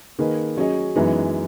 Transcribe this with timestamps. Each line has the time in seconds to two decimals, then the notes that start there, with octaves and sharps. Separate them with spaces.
0.19 D#3 A#3 D#4 G#4 B4
0.57 F#3 C#4 G#4 D#5
0.96 F#2 E3 G#3 B3 D#4